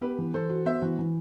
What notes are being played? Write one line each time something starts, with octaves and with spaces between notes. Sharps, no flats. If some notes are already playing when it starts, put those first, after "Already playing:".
B3 G4 B4
E3
E3 A4 C5
F#4
B3 C5 E5
E3 F#4
E3